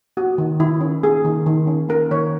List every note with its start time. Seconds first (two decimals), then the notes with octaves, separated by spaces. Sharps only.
0.17 A#3 F#4
0.38 D#3
0.60 D#3 E4
0.81 C#4
1.03 A#3 G#4
1.25 D#3
1.46 D#3
1.67 C#4
1.89 A#3 A#4
2.11 D#3 C#5